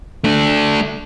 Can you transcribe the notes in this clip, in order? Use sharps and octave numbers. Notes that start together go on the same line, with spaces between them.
A3 D4